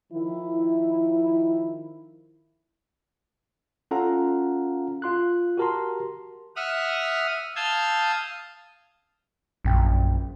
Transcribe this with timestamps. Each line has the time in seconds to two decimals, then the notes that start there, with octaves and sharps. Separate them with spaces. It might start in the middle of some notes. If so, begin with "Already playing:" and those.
0.12 D#3 F3 E4
3.91 C#4 F4 A4 F5 F#5 A#5
5.02 F4 C6 F#6
5.58 F#4 G4 A#4 A5 A#5 C6
6.56 E5 F#5 D#6 F6
7.56 F5 A5 D#6 E6 G6 G#6
9.65 A#1 F#2 G5